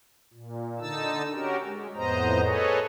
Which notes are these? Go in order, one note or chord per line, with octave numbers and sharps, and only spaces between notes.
A#2
D3 D#4 A5 E6
C#4 F#4 G4 A#4
G#3
F2 A2 B3 C5 D#5 A#5
G#4 A4 B4 C#5 D#5